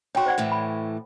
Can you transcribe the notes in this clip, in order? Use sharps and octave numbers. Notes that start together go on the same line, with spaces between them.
D#4 F#4 C#5 G5 C6
C5 D5 F#5
A2 E3 A3
B5